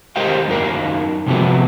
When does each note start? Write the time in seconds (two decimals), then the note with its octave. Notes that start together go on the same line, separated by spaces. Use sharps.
0.16 G4 A#4 C5 D#5 F5 G5
0.48 F#2 D#4 A#4 F5
1.26 C3 F3 F#3 A3 B3